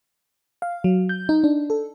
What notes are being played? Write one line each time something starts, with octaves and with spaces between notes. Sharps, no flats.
F5
F#3
G6
D#4
D4
A4